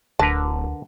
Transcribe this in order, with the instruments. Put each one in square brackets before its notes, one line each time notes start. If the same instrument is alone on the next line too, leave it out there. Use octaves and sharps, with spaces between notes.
[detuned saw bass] D1 [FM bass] D2 [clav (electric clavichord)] D3 A#4 B4 [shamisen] A5